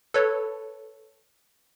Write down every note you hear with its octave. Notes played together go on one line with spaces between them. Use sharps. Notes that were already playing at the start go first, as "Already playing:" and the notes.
A4 B4 C#5